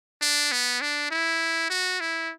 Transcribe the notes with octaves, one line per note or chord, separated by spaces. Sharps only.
D4
B3
D4
E4
F#4
E4